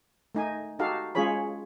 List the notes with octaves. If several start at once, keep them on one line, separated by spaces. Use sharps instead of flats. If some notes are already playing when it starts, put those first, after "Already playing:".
A3 D#4 G#5
D#4 F#4 G4 A4 F5
G#3 C#4 F4 G#4 C#5 B5